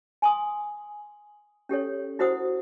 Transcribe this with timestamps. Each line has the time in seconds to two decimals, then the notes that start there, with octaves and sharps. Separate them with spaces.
0.22 G#5 C6 D#6
1.69 C#4 G4 A4 C#5
2.19 E4 F#4 A#4 C5 F#5 D#6